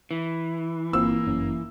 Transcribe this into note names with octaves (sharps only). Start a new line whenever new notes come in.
E3
G1 A#3 C4 F4 E6
G1 F#2 C#4